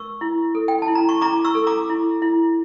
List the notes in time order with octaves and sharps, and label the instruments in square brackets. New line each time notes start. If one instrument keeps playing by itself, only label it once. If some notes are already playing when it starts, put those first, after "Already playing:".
Already playing: [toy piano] A#4 C#6 E6
E4
A4
G5
A5
E4
A#5
C#6
E4 A#5 D6
C#6 E6
A4
A#5 D6
E4
E4